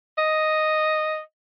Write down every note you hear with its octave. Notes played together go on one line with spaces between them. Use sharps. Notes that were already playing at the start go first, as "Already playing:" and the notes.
D#5